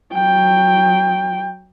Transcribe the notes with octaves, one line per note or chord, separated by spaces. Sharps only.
F#3 G5